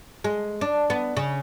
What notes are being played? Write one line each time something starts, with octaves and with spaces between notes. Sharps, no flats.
G#3
D4
B3
C#3